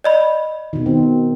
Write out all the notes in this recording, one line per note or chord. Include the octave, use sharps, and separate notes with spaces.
D5 D#5 B5
B2 D#3
C4